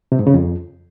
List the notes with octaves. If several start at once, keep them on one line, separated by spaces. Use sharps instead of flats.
C3
G#2
C#3
F2